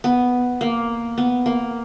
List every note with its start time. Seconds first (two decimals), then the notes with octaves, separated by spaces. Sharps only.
0.04 B3
0.61 A#3
1.18 B3
1.46 A#3